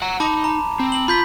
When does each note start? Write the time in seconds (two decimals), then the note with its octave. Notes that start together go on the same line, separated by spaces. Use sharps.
0.02 F#5 A#5
0.20 D#4 A5 B5 D6
0.44 A#5
0.79 C4
0.92 F#7
1.08 F4 B5 G6 B6